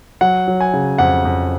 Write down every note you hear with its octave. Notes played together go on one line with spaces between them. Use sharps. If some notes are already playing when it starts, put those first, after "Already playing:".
F#3 F#5
F#3
G#5
C#3
F2 F#5
F2